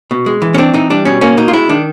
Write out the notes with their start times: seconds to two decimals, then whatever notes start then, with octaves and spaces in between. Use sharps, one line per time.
0.11 B2
0.26 G#3
0.42 E3
0.54 C#4
0.58 C4 D4
0.74 E3 D#4
0.90 G3 D4
1.05 B2 C#4
1.21 A#3 C#4
1.37 B2 D#4
1.48 F4
1.53 G#3 E4
1.69 D#3 D4